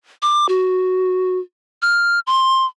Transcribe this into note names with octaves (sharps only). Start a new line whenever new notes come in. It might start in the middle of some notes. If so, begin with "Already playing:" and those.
D6
F#4
F6
C6